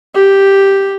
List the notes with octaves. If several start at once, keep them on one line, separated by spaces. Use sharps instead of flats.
G4